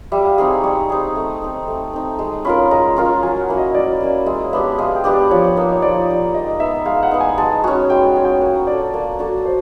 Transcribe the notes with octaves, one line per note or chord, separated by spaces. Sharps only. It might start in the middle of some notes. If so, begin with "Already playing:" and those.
G3 E5
F5
C4 D#4 G#4
G#5
G3 C#6
C4 D#4 G#4
A3
C4 D#4
A3
C4 D#4
G#3
C#4 F4 A#4 B5
G#3 A#5
C#4 F4 A#4
F#3 G#5
F#5
A#3 C#4 E4
D#5
F#3 D5
A#3 C#4 E4
G#3 E5
B3 D4 G4 E5
G#3 F5
G5
B3 D4 G4
D5
F3 C#5
A#3 D#4
C#5
F3 D5
A#3 D#4
G#3 D#5
B3 D#4 E5
G#3 F5
F#5
B3 D#4
G#5
G#3 A5
C#4 F#4 G#5
G#3 G5
F#5
C#4 F#4
G5
A#3 F#5
D4 F#4 A4 D5
A#3
D4 F#4 A4
C5